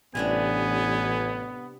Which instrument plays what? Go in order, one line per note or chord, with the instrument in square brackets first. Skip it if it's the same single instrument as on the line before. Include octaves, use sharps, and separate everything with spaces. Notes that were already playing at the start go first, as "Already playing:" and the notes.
[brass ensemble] A1 [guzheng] C3 G3 D4 [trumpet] B3 [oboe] G#5